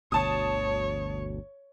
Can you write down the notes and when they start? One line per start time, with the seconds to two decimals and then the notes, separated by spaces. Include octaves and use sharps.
0.12 G1 D2 B2 C#5 A5 D#6